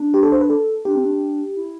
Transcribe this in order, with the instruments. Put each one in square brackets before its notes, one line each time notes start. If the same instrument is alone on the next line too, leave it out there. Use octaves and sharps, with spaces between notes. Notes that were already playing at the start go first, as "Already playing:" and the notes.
Already playing: [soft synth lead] D4
[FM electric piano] G4
A4
C5
B4
A4
[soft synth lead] D4 [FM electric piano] G4
[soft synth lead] C4
D4
E4